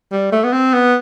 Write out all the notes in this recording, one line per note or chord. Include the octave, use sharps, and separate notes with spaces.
G3
A3
B3
C4
B3